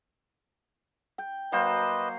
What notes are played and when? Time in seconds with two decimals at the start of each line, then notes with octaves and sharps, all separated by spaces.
1.18 G5
1.52 F#3 A#3 B4 C5 D#5